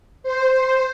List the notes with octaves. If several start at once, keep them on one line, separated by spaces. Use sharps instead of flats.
C5